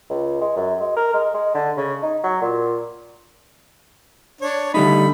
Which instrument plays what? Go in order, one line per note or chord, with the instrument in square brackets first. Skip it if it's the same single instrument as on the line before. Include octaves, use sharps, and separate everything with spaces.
[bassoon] C#2
G#3
F#2
G#3
A#4
G#3
G#3
D3
C#3
D#4
F#3
A#2
[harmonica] D4 C#5
[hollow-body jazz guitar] D3 G3 D#4 [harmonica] A3 B5